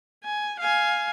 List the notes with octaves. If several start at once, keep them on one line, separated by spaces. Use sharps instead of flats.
G#5
F5 G#5